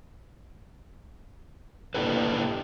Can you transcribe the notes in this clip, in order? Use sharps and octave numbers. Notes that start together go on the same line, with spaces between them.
A#3 D4 E4 G4 A4 B4